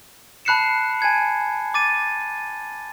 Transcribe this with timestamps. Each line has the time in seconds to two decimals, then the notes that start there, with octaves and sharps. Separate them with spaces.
0.45 A5 B5 F#6 C7 C#7 E7
1.00 G#5 A5 G#6 C#7
1.74 D6 A6 D#7